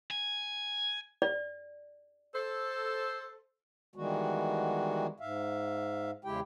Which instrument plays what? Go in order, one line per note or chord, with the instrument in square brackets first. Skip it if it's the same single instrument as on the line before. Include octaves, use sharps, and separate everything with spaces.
[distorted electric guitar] G#5
[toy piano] D5
[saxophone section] A4 C5
[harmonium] D#3 E3 G3 G#3 B3 F#4
G#2 E5 F5
E2 C#3 G#3 E4 G4 G5